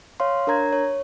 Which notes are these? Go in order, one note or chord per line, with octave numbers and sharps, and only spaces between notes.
C#5 F5 C6
D4 A#4 C#5 A#5 G#6
C#5